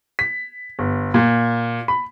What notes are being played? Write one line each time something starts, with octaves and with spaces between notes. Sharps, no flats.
B6
G1
A#2
B5